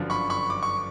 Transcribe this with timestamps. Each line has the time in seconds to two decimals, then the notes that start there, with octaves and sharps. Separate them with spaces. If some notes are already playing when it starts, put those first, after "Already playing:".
Already playing: G1 F#2 D3 F3
0.10 B5 C#6
0.30 B5 C#6
0.50 D6
0.63 C#6